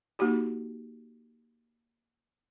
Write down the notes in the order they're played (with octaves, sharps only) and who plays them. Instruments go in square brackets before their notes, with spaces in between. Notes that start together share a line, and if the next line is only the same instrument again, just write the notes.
[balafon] A#3 D#4 F#4 G4